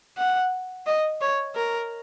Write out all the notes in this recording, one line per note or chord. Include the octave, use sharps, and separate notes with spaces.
F#5
D#5
C#5
A#4